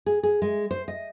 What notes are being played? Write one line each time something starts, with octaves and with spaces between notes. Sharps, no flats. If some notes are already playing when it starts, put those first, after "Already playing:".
G#4
G#4
G#3
C5
D#5